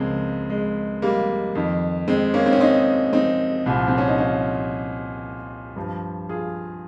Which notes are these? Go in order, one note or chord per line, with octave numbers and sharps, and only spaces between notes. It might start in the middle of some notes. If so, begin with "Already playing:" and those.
Already playing: C#2 C#3 F3 G#3 A#3 C4
G#3
G3 A#3
F2 D#3
G#3 C4
A#3 C#4
C4
C#4
C4 D#4
C4 D#4
C2 A#2 F3
C4
C#4
D#4
C#4 F4
G2 F3
F4 G#4